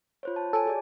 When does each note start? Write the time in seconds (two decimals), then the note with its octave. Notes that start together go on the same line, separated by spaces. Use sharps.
0.23 F4 C5 C#5
0.36 A5
0.53 A4 C#5 G#5 A5
0.66 F#4 G#4 D5